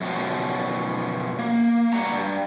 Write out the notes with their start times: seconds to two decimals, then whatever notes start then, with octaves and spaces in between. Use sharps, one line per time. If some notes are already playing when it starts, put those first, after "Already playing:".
0.01 F#2 B2 F3
1.39 A#3
1.93 G2 G3 F#4 A#5
2.13 G2